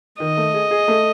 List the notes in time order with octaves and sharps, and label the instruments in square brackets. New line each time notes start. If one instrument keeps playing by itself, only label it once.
[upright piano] D#3 [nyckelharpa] D#5
[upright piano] A3
G#4
G#4
A3